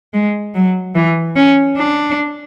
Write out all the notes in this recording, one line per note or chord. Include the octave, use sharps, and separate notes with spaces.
G#3
F#3
E3
C#4
D4